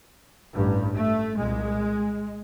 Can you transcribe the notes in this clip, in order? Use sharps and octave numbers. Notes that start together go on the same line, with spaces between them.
A1 G2
A3
C2 A#2 G#3